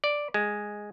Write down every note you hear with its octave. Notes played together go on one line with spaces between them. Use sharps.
D5
G#3